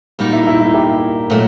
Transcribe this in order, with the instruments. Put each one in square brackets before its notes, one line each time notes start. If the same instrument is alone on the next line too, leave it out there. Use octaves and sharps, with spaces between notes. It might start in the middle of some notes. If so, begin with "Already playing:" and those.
[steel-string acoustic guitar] A#2 G3 A#3 D#4 F#4
[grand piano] E4
E4
E4
G4
[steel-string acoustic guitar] A#2 F#3 A3